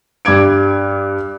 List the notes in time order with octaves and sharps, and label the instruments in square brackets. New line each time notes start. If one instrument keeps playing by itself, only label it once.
[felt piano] G2 D6 G#6 D7